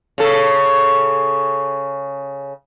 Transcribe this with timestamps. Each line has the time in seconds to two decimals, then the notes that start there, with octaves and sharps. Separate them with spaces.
0.18 C#3 A4